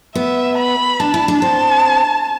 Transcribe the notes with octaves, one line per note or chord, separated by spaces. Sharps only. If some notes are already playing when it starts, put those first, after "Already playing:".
B3 E5
B5
D4 A5
E4
D4
C4 A5